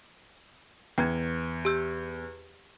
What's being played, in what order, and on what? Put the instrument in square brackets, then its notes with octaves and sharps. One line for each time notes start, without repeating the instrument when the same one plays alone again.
[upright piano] E2 [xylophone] G5 A#5 G#6
[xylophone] G4 E6 G6